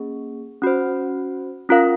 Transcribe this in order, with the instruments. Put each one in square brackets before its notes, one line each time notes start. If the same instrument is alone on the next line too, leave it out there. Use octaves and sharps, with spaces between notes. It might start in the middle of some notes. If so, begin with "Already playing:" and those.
Already playing: [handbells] A#3 C#4 G#4
C#4 F#4 C5
C#4 F4 A#4 F5